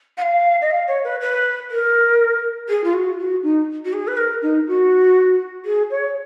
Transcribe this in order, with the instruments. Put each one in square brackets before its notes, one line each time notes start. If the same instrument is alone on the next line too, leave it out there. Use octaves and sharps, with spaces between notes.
[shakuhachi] F#5
F5
D#5
F5
C#5
B4
B4
A#4
G#4
F4
F#4
F#4
D#4
F#4
G#4
B4
A#4
D#4
F#4
G#4
C#5